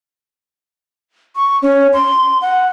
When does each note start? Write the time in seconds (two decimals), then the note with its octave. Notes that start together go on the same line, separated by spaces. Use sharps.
1.36 C#6
1.62 C#4
1.93 C6
2.42 F#5